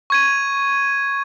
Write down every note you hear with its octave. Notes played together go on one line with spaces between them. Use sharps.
C#6 G#6 D#7